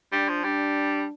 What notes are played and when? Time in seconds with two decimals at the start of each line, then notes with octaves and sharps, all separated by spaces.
0.12 G3 D4
0.29 F3
0.44 G3 D4